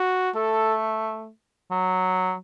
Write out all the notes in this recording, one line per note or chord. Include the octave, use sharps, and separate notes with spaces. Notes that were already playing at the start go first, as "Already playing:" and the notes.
Already playing: F#4
A3 A4
F#3